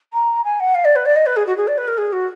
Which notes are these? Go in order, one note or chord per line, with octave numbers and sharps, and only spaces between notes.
A#5
G#5
F#5
F5
D5
B4
D5
D#5
B4
G#4
F#4
G#4
D5
B4
A#4
G#4
F#4